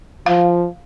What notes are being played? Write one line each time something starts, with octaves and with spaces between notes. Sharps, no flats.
F3 F5